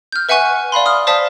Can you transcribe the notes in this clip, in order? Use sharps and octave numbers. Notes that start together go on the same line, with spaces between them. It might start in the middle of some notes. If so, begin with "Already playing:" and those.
F6 G6
B4 E5 F#5 G#5 C#6 F#6
D5 F5 B5 C6
D#6 F6
C5 D5 F5 A5 D#6 B6